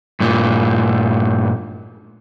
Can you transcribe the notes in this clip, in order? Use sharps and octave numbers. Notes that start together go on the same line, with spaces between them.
G2 A#2